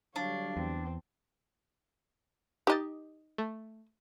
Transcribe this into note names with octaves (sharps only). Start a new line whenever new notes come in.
D3 F#3 G3 D4 C#5 F5
E2 C4
D#4 G4 D#5 A6
A3